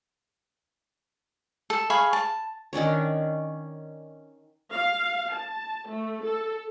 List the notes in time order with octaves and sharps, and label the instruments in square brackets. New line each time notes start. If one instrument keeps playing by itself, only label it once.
[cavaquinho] A4
G#4 F5 B5 C#6
A5
[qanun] D#3 C#4 D4 C#5
[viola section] F5
A5
A3
A4